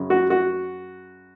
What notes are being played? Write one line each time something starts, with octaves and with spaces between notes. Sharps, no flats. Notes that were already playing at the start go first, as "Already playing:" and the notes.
Already playing: F#2 C#3
F#4
F#4